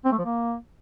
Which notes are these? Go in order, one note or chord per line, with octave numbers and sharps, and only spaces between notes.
C4
A3
F3
A#3